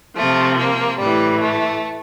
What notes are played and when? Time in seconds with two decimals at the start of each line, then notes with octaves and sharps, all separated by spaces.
0.16 C3 F3 A3
0.58 A#3
1.00 A2 E3 G3
1.41 A3